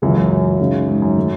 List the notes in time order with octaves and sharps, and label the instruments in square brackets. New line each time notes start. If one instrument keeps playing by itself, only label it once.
[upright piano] C#2 C#3 E3 [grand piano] F#2
[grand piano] F#2
F#2
[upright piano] C#2 C#3 G#3 D#4
[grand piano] G#2
F#2
[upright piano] D#3 A3